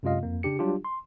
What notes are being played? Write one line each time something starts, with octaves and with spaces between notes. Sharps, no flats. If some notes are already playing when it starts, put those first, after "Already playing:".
F#2 C3 G#3 F4 D#5 F5
F2 A#3
C#3 D4 G4 C#7
F#3 G3 D4 F4 G4
C6